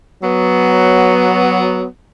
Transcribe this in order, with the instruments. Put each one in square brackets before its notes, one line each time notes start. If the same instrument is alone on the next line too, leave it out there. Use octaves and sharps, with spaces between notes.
[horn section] F#3 B3